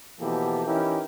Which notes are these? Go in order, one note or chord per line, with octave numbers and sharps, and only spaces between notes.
B2 E3 F3 A#3 G4 A4
E3 C#4 D#4 E4 G4 A#4